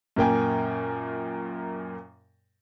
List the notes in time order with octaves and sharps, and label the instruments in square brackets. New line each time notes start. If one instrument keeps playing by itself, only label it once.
[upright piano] F#2 A#2 A#3 G5 G#5